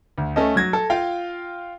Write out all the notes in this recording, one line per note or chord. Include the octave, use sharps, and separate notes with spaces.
D2
A3 C#4 A4 D#5
F#3 G#6 A#6
A4
F4 F5 G5